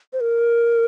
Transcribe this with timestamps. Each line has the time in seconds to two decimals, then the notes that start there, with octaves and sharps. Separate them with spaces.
0.13 C5
0.20 A#4